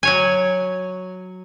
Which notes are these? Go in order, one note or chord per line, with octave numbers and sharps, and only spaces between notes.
F#3 C#5 G#5